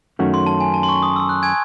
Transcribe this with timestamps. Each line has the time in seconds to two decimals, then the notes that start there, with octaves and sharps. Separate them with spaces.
0.19 F#2 D#3 A3 C#4 F#4
0.34 C6
0.46 A5
0.60 G#5
0.74 A5
0.83 C6
0.89 C#6
1.03 D#6
1.16 E6
1.29 F#6
1.43 G#5 G#6